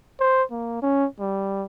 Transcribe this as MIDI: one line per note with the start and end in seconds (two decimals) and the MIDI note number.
0.20 0.43 72
0.51 0.80 58
0.82 1.06 61
1.20 1.65 55